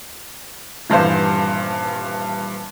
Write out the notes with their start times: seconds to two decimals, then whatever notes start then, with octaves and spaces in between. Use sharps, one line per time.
0.90 D#1 G2 E3 C5 F5